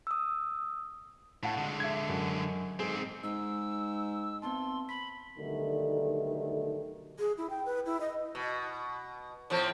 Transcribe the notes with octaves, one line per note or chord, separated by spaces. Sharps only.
D#6 E6
A2 F#5 A5
D3 G#3
E5 G#6
F#2
G#2 C4 G#4
G#2 E6
B3 C4 A5 C6
B5 B6
B1 D3 D#3 G3 A3
G#4
E4
G5
B4
E4
D#5
B2
A2 F3 C4